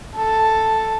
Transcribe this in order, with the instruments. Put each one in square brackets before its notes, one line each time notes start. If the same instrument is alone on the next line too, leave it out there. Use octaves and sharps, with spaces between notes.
[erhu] A4